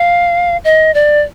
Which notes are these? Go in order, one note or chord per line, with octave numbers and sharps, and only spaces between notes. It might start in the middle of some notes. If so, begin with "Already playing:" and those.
Already playing: F5
D#5
D5